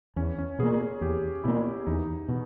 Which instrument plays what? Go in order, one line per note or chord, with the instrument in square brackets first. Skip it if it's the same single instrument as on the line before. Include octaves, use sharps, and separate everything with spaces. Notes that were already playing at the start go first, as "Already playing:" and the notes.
[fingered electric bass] E2 [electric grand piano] C#4
[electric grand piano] C#4
[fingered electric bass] B2 A#3 [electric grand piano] G#4
[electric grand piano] G#4
[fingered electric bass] E2 [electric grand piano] G4
[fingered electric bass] B2 A#3 [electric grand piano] E4
[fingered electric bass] E2 [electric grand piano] D#4
[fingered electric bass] B2